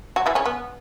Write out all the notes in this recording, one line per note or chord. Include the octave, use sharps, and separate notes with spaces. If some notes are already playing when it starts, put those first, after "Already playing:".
F#3 F#4
E3 E4
C#3 C#4
B3